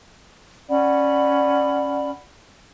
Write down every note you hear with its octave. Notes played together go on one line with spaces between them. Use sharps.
C#4 D5 F#5 B5